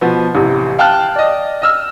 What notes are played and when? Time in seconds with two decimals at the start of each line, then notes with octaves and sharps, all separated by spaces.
0.01 B2 F3 B3
0.35 A1 C3 E3
0.79 F5 G5 A5 F6 F#6
1.16 D5 D#5
1.62 D#5 E6 F6